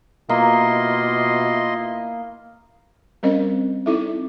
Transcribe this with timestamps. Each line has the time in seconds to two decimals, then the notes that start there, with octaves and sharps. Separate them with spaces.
0.29 B2 A#3 E4 F4 D#5 C6
3.23 G3 C4 C#4 A#4 C5 D#5
3.86 C4 D#4 E4 A4 E5